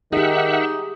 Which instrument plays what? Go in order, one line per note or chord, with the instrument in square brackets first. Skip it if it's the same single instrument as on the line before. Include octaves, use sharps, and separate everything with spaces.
[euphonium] D#3 [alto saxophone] D#4 [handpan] G4 G#4 [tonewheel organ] E5 F#5